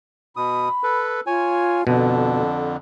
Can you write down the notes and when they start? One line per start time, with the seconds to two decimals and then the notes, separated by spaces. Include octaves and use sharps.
0.36 B2 B5 D#6
0.83 A4 B4
1.27 F4 C#5 G#5
1.87 F2 B2 D3 A5